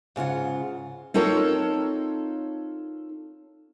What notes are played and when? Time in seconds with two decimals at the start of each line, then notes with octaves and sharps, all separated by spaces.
0.16 G#2 C#3 F4 F#5
1.14 C4 D#4 F4 A4 A#4 C#5